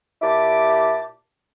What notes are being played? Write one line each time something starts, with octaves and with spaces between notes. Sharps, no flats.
A#2 E4 G4 A5 D6